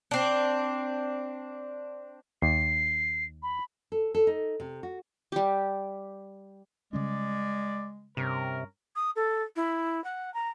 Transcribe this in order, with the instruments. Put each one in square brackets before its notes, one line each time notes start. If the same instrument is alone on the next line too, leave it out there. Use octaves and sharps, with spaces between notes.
[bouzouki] C4 D4
[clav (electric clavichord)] D#2 [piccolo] C7
[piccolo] B5
[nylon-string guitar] A4
A4
D#4
C3
F#4
[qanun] G3 G4
[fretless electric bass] C#3 G3 C#4 [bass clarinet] G#3 [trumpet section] D5
[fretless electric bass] G2 [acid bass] C3 [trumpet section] C#4 A#4
[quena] D#6
A4
E4
F#5
A#5